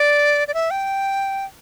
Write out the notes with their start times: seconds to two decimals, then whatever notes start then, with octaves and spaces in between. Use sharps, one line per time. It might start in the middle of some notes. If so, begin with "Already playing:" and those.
Already playing: D5
0.48 D5
0.54 E5
0.71 G5